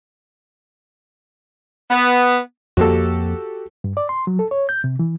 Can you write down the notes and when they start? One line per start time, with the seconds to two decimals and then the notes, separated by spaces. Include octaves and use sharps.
1.89 B3
2.77 F2 A#3 F#4 G4 A4
3.84 G2
3.97 D5
4.09 C6
4.27 F#3
4.39 A4
4.51 C#5
4.69 G6
4.84 C3
4.99 E3